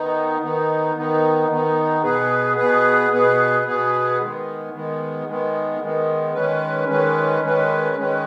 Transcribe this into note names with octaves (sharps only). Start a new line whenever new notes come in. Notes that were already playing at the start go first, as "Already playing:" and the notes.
Already playing: D#3 B3 D#4
D#3 B3 D#4
D#3 B3 D#4
D#3 B3 D#4
B2 B3 G#4 B4
B2 B3 G#4 B4
B2 B3 G#4 B4
B2 B3 G#4 B4
D#3 G#3 B3
D#3 G#3 B3
D#3 G#3 B3
D#3 G#3 B3
D#3 G#3 C#4 B4
D#3 G#3 C#4 B4
D#3 G#3 C#4 B4
D#3 G#3 C#4 B4